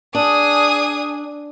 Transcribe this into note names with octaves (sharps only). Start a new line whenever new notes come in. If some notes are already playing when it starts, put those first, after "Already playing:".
D4 G#4 D#6